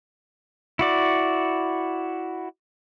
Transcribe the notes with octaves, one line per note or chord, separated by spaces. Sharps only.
E4 F#4 D5